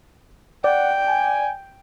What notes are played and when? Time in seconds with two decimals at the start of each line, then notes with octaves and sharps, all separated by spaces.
0.64 D5 F#5 G5
1.08 G#5